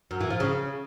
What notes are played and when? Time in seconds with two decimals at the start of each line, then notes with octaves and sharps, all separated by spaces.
0.11 F#2
0.21 E3
0.30 F3
0.40 C#3